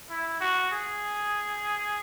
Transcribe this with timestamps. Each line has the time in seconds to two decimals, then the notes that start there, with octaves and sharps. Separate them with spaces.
0.10 E4
0.40 F#4
0.71 G#4